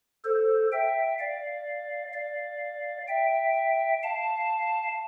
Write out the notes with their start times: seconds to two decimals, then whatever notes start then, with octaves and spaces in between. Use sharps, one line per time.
0.24 A4 C5
0.72 E5 G5
1.19 D5 F5
2.13 D5 F5
3.08 E5 G5
4.03 F5 A5